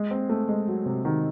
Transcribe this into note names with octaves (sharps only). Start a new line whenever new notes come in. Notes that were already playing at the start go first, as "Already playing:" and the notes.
Already playing: G#3
C4
A3
G#3
F#3
C3
D#3